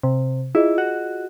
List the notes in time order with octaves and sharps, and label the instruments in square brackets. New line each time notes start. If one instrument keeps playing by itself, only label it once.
[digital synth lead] C3
[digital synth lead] E4 [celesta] F4 G#4 D#5
[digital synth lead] F#4